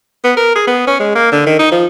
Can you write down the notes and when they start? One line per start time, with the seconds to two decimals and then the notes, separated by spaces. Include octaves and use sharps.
0.24 B3
0.37 A#4
0.56 G#4
0.67 B3
0.87 C#4
1.00 G#3
1.15 A#3
1.32 D3
1.47 D#3
1.59 D#4
1.71 F3